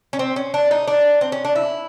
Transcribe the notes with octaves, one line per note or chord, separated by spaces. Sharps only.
C#4
C4
C#4
D4
D#4
D4
C4
C#4
D4
E4